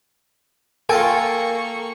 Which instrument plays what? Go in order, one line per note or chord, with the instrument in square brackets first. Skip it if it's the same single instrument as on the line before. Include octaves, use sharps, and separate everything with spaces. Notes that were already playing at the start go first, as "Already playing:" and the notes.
[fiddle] A#3 C#6 [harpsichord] F4 A4 [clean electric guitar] A#4 G5 G#5